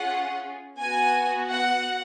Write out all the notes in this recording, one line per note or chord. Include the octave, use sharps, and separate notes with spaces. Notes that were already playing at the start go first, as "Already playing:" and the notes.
Already playing: C#4 F4 G#4 F#5
B3 F#4 G#5
F#5